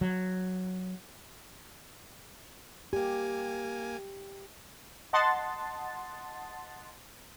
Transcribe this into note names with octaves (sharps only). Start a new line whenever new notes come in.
F#3
A#3 G4 G#5
D#5 F#5 A5 C6 A6